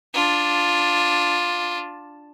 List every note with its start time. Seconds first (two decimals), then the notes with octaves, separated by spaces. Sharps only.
0.14 D4 F4